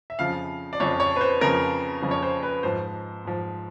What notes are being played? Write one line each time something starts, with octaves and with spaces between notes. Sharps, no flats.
E5
F2 C#3 F3 F5
D5
F2 C#3 F3 C#5
C#5
B4
C5
F2 C#3 F3 A#4
F2 C#3 F3
C#5
C5
B4
G#2 F3 C5
G#2 F3